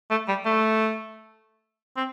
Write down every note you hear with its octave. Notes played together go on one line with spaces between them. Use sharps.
A3
G3
A3
C4